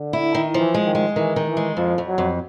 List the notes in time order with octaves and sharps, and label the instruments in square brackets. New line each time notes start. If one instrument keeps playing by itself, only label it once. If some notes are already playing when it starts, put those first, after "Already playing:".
Already playing: [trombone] D3
[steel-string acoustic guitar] E4
D#3
[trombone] E3 [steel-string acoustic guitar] F3
[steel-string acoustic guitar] G#3
[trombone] D#3
[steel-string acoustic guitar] G#3
[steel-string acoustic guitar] D#3 [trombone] E3
[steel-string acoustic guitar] D#3
[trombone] E3
[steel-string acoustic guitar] G#3
[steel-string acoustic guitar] F2 [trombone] F3
[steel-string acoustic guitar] F2
[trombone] F#3
[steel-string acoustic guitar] F2